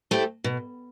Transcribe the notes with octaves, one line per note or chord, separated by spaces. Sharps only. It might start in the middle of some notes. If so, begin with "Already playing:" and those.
A3 C4 E4 G4
B2